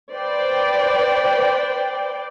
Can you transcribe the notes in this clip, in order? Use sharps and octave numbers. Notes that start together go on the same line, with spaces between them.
B4 C5 D5 G5